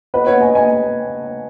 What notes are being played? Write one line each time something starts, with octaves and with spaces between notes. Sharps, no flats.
B4 D#5
C#5 F#5
D#5 G#5
D#5 G#5